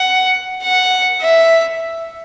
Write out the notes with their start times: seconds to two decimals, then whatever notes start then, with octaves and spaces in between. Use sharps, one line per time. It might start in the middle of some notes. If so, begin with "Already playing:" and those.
Already playing: F#5
0.63 F#5
1.21 E5